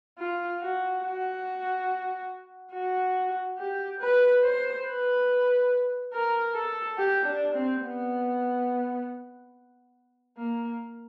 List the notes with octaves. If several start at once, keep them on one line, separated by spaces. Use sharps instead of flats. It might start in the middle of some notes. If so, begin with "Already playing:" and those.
F4
F#4
F#4
F#4
G4
B4
C5
B4
A#4
A4
G4
D4
C4
B3
A#3